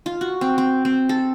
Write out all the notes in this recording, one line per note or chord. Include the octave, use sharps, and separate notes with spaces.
F4
F#4
C4
C4
C4
A4